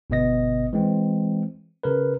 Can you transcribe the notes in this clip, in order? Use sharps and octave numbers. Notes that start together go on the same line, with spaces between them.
G1 B2 B3 D#5 A#6
E3 G#3 C4
C#3 A#4 B4